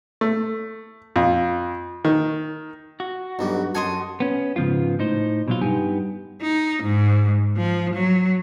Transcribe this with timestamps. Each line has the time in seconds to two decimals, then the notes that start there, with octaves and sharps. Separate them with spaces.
0.21 A3
1.16 F2
2.05 D#3
3.00 F#4
3.39 B1 G2 G3
3.75 F#2 A4 D#5 G#5 C6
4.20 B3 C#4
4.56 G#2 C#3 F3 B3 F4
4.99 A2 D#4 C5
5.48 B2 F#3 F4
5.61 G2 B3 D#4 G4 G#5
6.42 D#4
6.83 G#2
7.57 F3
7.94 F#3